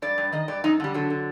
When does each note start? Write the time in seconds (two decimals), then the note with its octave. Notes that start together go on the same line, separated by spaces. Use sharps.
0.02 G2 D5
0.18 G2
0.32 D#3 D#5
0.48 G2 D5
0.64 F#2 D#4
0.80 D3 G3
0.94 D3 F#3
1.10 D3